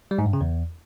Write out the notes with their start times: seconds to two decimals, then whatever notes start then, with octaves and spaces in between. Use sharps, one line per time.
0.11 G3
0.18 G#2
0.26 G2
0.33 C#3
0.41 E2